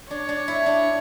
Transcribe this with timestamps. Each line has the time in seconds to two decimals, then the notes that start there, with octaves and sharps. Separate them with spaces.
0.10 D4 C#5
0.29 D4
0.48 E4
0.66 D4